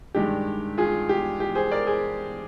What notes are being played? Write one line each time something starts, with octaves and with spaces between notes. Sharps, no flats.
G2 D#3 G#3 D4 G4
F4 G#4
G4
G4
G#4 C5
A#4 D5
G#4 C5